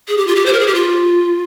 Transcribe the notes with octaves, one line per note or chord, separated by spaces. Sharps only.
G#4
G4
F4
G4
C5
A#4
G#4
G4
F4